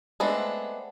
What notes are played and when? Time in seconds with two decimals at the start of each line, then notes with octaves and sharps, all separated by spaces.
0.20 G#3 A3 B3 C4 D4